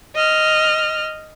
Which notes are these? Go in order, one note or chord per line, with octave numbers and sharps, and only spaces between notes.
D#5 F6